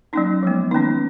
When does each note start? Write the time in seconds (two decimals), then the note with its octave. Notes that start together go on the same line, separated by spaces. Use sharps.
0.13 F#3 A#3 C#4 D#4
0.43 F3 G#3 B3
0.71 D#3 A#3 C#4 D#4